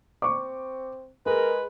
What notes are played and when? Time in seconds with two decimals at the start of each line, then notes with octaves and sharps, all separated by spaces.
0.22 C4 C#6 D6
1.26 G#3 G#4 A#4 B4